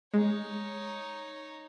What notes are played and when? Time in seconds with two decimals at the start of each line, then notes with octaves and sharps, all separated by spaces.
0.14 G#3 D#4 C#5